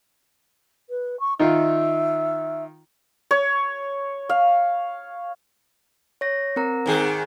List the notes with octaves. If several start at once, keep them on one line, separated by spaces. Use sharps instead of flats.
B4
C#6
D#3 D#4 F4 E5
C#5
F5
C#5 A#6
C4 A#4 A#5
G#2 D#3 G#4